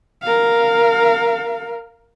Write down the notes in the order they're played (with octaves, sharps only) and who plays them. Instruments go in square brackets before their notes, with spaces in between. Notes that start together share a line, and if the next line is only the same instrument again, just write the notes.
[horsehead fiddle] A#4 F5